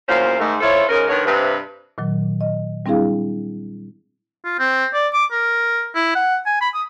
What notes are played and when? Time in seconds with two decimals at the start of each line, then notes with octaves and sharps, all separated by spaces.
0.08 E2 A#2 F#3 C#4 C5 F5
0.39 G#2 D#3 A3
0.61 E4 F4 A4 C5 C#5
0.89 G#2 C#3 C#4 A#4
1.07 D3 D#3 B3 A#4 C#5
1.25 G2 C3 B4
1.98 A#2 D#3 F#3
2.41 D#5
2.86 G3 C4 D4 E4 G#4 F5
4.45 F4
4.59 C4
4.94 D5
5.13 D6
5.32 A#4
5.95 E4
6.15 F#5
6.46 G#5
6.61 B5
6.74 D#6